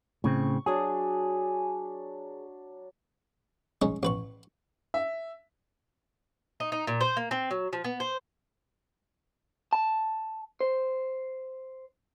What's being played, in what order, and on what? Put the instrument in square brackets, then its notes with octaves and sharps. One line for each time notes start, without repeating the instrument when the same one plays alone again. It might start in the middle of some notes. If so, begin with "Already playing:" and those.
[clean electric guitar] A2 C#3 C4 [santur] C#6
[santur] F#3 D4 [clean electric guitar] G#4
[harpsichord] G#3 C#4 D#4
A1 B4 C#6
[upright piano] E5
[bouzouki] D#4
D#4
A#2
C5
A#3
C4
F#3
F3
B3
C5
[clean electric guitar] A5
C5